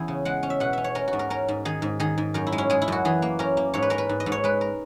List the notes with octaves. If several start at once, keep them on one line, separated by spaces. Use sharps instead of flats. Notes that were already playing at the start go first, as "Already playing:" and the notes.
Already playing: E2 C#4 E4 G#4
C#3
G#3 F#5
C#4
E5
B2 F#5
C#4 E5
C#5
C#4 A#4
F#4
G#2
A#4
C#4 A#4
G#2
D#3 G#4
G#2
D#3 G#4
G#2
F#2 A#4
E4
G#3
C#4
G#3 G#4
E4
F#2 F#4
E3 G#4
A#3
C#4 A#4
A#3
G#2 C#5
B4
C#4 A#4
B4
G#2
D#5
G#2
C#5
G#3 B4
A#4